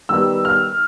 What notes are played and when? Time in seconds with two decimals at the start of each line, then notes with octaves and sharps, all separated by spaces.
0.09 D#3 G3 B3 E6
0.45 F6